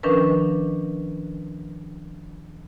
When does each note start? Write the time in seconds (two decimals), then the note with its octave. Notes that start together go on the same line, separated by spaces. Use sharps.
0.03 D#3 F3 C#4 D4 A#4 B4